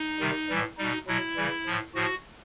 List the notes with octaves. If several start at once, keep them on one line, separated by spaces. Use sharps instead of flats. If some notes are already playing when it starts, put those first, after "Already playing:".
Already playing: D#4
C3 D#3 G3
A2 E3 G3
B2 G3 D#4
B2 F#3 E4
C#3 E3 G3
A2 F3
A2 F3 F#4